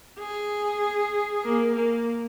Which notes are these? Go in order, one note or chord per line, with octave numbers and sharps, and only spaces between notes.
G#4
A#3
A#3